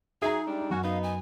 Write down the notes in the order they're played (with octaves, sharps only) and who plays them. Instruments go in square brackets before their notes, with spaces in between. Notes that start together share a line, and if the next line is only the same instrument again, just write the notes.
[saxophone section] F#3 G#4 [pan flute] D#4 [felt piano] E5 A#5
[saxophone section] G3 G#3 D4
[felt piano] F#2 [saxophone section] C#4 F#4
[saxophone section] B3 D#4 [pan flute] F5
[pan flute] G#5